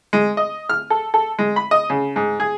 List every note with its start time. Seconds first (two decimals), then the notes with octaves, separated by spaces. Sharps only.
0.13 G#3
0.37 D#5
0.69 F6
0.90 A4
1.14 A4
1.39 G#3
1.56 B5
1.71 D#5
1.90 C#3
2.16 G#2
2.40 G#4